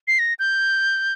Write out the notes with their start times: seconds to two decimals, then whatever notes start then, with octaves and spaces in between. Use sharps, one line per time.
0.08 C7
0.19 A#6
0.39 G6